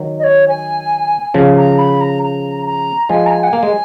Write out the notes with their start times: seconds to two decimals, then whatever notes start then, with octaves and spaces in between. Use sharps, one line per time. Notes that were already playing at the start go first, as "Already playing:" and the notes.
Already playing: D#3 F#3
0.19 D#5
0.24 C#5
0.48 G#5
1.34 C#3 F3
1.57 A#5
1.78 B5
2.01 A#5
2.22 A#5
2.66 A#5
3.09 F3 G#3 G#5
3.26 A#5
3.30 G#5
3.43 F#5
3.47 G#5
3.53 A#3
3.63 G#3